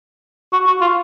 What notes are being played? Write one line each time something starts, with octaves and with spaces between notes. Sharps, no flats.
F#4
F#4
F4